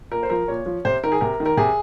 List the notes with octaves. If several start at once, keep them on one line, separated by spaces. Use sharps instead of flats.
A#2 A#4
C5
F3 A#4
A#2 C#5
F3
C3 C5
D#3 A#4
G#4
C3 A#4
D#3
A#4
C3 G#4